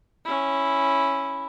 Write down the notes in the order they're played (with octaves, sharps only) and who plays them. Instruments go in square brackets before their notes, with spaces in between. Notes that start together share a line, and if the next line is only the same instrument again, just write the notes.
[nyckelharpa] C#4 E4